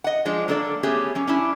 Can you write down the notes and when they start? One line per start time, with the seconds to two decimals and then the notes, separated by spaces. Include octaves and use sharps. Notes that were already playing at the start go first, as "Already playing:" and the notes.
0.04 D#5 F#5
0.25 F3 G#3 D4
0.48 F#3 A#3 D4 A4 A#4 D5
0.83 A3 B3 C#4 G4 G#4
1.15 F#3 C#4
1.27 C#4 D4 E4